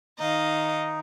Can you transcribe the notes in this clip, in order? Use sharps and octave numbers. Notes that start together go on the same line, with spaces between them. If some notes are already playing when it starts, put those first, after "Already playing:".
D#3 D#4 D#5 F5